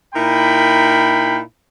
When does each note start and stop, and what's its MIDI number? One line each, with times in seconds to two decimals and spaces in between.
0.14 1.40 46
0.14 1.40 63
0.14 1.40 64
0.14 1.40 70
0.14 1.40 79
0.14 1.40 83